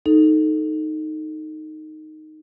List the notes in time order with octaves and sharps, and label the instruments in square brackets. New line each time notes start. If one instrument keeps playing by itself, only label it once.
[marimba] D#4 A4